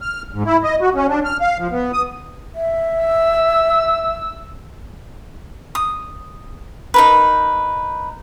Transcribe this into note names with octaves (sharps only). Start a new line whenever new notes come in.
F6
G#2
E4
D#5
F#4
C#4
D4
F6
F5
F3
B3
D#6
E5
E6
D#6
D#4 A#4 B4